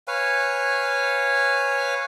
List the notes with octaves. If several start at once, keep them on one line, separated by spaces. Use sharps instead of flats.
B4 C#5 F5 G#5